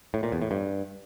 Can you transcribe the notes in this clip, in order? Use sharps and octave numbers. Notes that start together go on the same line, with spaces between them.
A2
A#2
E2
A2
G2